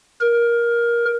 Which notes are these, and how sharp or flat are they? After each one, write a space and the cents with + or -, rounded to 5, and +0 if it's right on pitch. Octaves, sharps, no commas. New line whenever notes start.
A#4 +15